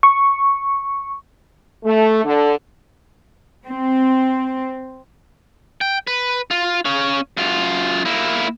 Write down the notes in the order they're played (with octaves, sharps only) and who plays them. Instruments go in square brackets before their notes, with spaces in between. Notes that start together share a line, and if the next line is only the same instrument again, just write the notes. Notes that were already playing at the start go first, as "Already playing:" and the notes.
[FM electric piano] C#6
[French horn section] A3
D3
[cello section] C4
[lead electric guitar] G5
B4
F4
C#4 F5
F#2 F4
A#3 E4